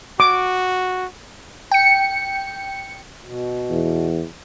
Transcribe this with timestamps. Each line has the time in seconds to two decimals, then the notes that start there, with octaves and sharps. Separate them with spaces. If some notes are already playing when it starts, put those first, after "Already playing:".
0.20 F#4 D6
1.72 G5 C#7
3.22 B2
3.70 E2